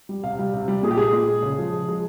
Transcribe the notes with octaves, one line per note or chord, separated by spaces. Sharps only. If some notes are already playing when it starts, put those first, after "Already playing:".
G3
C3 F5
G3
C3
G3
A#2 G#4
G4
G#3 G#4
A#2
G#3
C#3
F3 G#3
C#3
F3 G#3